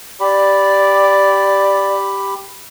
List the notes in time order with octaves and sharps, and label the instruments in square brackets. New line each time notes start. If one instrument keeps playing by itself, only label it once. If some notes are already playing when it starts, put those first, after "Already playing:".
[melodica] G4 B5 [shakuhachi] D5